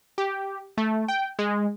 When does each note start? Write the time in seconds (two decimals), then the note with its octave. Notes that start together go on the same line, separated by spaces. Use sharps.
0.18 G4
0.78 A3
1.08 G5
1.39 G#3